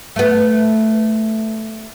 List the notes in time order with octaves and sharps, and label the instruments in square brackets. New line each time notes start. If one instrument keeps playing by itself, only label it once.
[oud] A3 B3